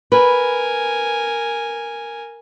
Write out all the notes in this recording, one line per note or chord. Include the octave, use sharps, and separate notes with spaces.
A#4 B4 G#5